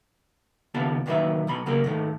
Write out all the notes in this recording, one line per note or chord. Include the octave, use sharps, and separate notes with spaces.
C#2 D#3 B3 F4 G4 A5
A#2 D#3 E3 F#3 B4 E5
B1 B2 B5
C#3 F#3 A#3 G4 G#4 A#4
G#2 D#3 G#3 A3